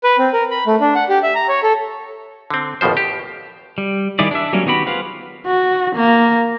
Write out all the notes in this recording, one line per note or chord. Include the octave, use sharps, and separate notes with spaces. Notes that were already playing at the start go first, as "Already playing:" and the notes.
B4
C4
A#4
B5
A3
D4
F#5
G4
E5
A#5
C#5
A4
D3 C4
A1 D#2 B2 F3 C5
G4
G3
D#3 G3 E4 G#4 D5
D4 E5
F#3 G3 A#3 C#4
D#3 B3 F#4 G4 B5
F4 G#4 B4 C5 F5
F#4
A#3